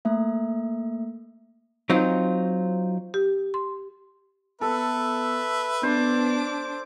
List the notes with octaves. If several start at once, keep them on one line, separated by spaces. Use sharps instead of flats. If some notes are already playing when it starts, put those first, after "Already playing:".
A3 A#3 E5
F#3 C4 D#4 F4
G4
C6
B3 A4 B4 E5
B3 D4 C5 D6